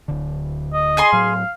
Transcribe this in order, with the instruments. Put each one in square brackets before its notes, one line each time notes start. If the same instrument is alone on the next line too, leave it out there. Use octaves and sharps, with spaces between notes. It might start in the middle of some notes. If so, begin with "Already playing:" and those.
[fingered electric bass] D1 D2 D3
[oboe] D#5
[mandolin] G#4 G#5 C6
[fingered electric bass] A2 F#3 [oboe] F5